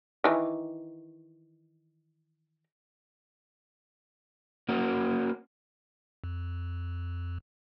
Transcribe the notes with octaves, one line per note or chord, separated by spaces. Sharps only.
D#3 E3
A#3 C#4 F#4
F2